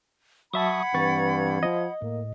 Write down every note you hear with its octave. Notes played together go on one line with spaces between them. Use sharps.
F#3 E5 F#5 A5 B5 C#6 D#6 G#6
G2 E3 C4 B4 C#6 A6
F3 D#5
A2 A#3